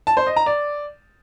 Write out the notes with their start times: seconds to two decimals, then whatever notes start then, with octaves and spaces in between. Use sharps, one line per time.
0.07 A5
0.17 C5
0.27 D#5
0.36 A#5
0.46 D5